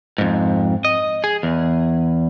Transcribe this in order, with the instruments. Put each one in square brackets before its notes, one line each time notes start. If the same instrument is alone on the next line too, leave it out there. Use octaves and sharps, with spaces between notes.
[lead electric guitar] F2 G#2
D#5
G#4
E2